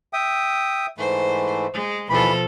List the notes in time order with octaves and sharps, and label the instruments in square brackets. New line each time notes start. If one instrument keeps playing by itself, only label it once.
[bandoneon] E5 G5 D#6
[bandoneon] G#2 E3 A3 [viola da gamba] C5
[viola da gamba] G#3
[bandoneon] D#2 E3 B5 [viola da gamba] B2 F3 A4